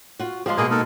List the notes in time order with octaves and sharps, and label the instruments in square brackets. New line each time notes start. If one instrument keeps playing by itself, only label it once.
[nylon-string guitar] F4 F#4
[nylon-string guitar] F3 G#3 [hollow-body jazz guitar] G4 F5 C6
[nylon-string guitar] B2 G#3 [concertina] A#3 G#4
[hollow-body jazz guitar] A#3 [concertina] D#4 A4 A#4